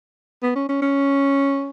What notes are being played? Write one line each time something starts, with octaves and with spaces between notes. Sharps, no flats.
B3
C#4
C#4
C#4